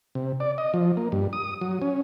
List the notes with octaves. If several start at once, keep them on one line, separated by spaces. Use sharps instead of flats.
C3
D5
D#5
F3
A#3
G2
D#6
F#3
C#4